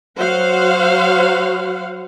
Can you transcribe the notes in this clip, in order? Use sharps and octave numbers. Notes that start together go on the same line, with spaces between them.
F#3 C5 F5 F#5